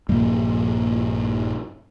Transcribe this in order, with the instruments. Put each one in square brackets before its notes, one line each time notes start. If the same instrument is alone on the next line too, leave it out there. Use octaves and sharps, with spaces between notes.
[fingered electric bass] A#1 G2 G3 A#3